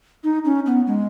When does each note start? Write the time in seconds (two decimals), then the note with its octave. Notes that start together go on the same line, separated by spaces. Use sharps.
0.24 D#4
0.45 C#4
0.66 B3
0.87 G#3